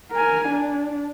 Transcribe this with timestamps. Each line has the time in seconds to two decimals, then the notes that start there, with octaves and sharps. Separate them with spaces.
0.12 A#4 G#5
0.49 D4